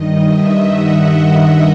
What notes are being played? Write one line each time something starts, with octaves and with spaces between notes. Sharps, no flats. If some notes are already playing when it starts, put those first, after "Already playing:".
Already playing: G2 D#3 D#5
E5
F#5
E5